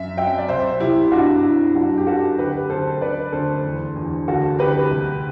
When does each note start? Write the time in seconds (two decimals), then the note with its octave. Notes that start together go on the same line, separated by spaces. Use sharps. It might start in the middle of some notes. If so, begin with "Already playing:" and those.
Already playing: F#2 E5
0.17 F#3 E5 G5
0.38 D5
0.48 C2 C5 E5
0.80 C2 E4 G4
1.12 G2 D4 F#4
1.43 G2 E4
1.75 F#2 D4 F#4
1.97 G4
2.06 F#3 F#4 A4
2.38 D2 G4 B4
2.70 D2 A4 C5
3.01 D2 B4 D5
3.32 D2 A4 C5
3.65 E2
3.96 E2
4.28 D2 F#4 A4
4.59 D2 G4 B4
4.91 C2